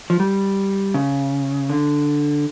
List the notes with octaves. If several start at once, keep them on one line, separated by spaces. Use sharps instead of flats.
F3
G3
C#3
D3